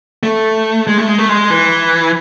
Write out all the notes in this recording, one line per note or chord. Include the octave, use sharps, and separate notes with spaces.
A3
G#3
A3
G#3
A3
G#3
E3